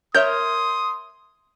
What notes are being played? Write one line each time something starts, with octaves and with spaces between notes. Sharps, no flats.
A#4 C#5 E5 C6 D#6 G6